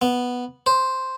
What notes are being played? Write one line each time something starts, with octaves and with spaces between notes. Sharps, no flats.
B3
C5